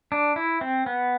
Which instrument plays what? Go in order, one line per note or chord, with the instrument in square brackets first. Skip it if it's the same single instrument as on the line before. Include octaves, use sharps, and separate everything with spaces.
[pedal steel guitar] D4
E4
C4
B3